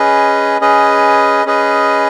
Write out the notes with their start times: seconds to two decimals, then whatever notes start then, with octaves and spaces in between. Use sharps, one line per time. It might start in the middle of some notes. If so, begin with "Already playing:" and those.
Already playing: C#4 G#4 B4 D#5
0.61 C#4 G#4 B4 D#5
1.46 C#4 G#4 B4 D#5